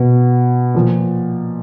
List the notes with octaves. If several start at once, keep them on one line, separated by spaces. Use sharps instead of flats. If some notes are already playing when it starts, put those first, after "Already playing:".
Already playing: B2
A#2 F3